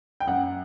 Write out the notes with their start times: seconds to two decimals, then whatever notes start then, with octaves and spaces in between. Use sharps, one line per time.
0.20 G5
0.27 F#2 F#5